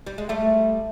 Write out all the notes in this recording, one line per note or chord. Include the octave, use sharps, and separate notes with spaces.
G3
G#3
G3 A3